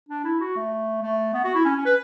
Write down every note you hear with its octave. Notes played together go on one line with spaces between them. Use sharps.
D4
E4
F#4
A3
A3
B3
F#4
E4
C#4
C#4
B4